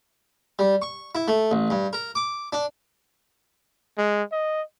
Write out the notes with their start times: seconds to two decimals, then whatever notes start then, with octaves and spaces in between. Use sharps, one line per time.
0.59 G3
0.82 C#6
1.15 E4
1.28 A3
1.51 A1
1.71 G2
1.93 A#4
2.15 D6
2.53 D4
3.98 G#3
4.32 D#5